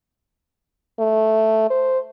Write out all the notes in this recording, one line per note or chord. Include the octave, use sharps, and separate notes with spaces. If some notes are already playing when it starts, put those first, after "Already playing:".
A3
C5